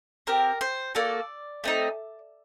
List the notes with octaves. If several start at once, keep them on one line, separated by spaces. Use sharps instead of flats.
C4 G4 A#4
C5
A#3 F#4 A4 D5
A3 C4 D#4